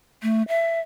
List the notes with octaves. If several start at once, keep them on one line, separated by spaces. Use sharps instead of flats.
A3
E5